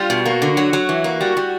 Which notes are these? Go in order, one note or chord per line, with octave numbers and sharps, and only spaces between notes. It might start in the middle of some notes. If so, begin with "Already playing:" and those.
Already playing: G3 F4
B2
A#3 F#4
D3
F#3
F#3
E3
A#3
G3 F#4
G3